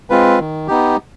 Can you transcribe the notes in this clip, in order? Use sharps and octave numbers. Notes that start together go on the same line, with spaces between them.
G#3 C4 F4 B4
D#3
B3 D#4 G4